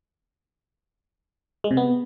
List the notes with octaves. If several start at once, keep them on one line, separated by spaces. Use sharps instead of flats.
G#3
C3
B3